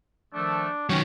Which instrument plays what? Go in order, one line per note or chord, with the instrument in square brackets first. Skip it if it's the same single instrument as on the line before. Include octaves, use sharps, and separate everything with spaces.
[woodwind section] D#3 F3 A3 [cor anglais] D4
[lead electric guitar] D#3 F#3 [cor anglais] C#4 [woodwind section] C#5 G5